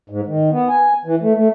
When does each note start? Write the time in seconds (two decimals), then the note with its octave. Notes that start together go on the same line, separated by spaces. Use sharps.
0.10 G#2
0.27 D#3
0.52 B3
0.69 G#5
1.05 E3
1.22 A3
1.37 A3